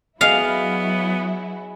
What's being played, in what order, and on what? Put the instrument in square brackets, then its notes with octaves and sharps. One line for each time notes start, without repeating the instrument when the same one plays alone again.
[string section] F#3 E4 F#4 [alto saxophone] B3 [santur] G#4 D#5 [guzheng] F5